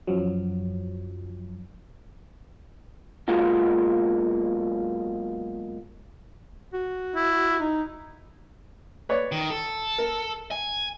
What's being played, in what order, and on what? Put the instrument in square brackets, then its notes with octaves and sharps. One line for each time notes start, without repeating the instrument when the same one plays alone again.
[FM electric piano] F#2 F3 F#3
[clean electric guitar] B1 F#3 G#3 A#3 F4 F#4
[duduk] F#4
[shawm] E4
[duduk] D#4
[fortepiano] B4 C#5 D5
[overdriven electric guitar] D#3
A4
[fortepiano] A#4
[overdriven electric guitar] G#5